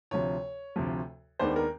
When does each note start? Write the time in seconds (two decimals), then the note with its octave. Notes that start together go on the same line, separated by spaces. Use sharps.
0.11 D2 C3 F3 C#5
0.76 D2 C3 F3
1.39 D#2 D#3 G#3 B3 D4 C5
1.56 A#4